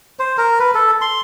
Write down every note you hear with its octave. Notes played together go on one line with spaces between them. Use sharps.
C5
A#4
B4
A4
C6